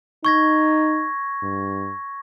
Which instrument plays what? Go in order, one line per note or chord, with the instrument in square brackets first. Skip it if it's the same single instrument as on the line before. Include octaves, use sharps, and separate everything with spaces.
[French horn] D#4 [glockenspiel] C#6 G#6 A#6
[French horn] G2